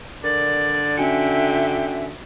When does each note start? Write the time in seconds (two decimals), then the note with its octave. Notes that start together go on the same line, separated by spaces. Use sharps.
0.24 D3 A#4 D5
0.97 C#4 F#4 E5 G5 G#5 C#7